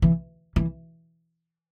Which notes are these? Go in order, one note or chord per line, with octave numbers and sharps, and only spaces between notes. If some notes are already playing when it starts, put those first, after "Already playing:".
E3
E3